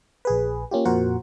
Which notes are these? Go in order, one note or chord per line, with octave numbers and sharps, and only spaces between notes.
A#1 G#4 B4
A#3 C#4 F4 G4
F2 A#2 F#4 A#4 C5 F#5